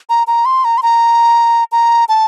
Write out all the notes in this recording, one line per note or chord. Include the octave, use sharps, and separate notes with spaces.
A#5
A#5
C6
A#5
C6
A#5
A#5
A5